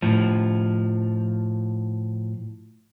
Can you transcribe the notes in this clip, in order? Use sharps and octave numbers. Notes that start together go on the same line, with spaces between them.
A2 F3